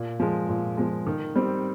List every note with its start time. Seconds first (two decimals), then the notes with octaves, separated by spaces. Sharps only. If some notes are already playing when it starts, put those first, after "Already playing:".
Already playing: A#2
0.20 F3 G#3
0.49 A#2
0.77 F3 G#3
1.07 D#3
1.36 G3 C4